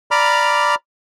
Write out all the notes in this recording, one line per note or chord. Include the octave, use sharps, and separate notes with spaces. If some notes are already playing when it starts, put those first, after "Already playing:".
D5 A#5 B5 D6 F6